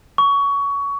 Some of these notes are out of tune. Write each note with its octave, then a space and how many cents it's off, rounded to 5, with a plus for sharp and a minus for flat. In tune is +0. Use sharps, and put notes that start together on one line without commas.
C#6 +20